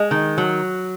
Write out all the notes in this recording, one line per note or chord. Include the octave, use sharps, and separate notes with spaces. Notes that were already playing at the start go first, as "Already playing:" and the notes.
Already playing: G#3
D#3
F#3